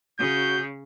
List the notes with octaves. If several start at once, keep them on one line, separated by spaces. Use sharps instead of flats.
C#3 F#4 G6